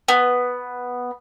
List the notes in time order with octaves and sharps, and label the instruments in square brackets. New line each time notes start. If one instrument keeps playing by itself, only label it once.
[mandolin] B3